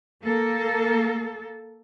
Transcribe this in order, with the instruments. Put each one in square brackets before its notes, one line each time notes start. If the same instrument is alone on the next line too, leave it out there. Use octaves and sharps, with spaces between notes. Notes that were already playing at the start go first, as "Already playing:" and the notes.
[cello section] A#3 A4